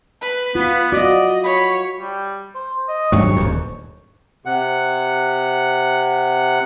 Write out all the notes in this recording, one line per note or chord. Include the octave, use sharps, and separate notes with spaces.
B4
B3 F4
F#4 D5 D#5
C#5 B5
G3
C5
D#5
G#1 G2 F#3 C#5
D#1 D#2
C3 F#5